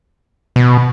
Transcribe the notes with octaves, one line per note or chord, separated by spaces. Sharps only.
B2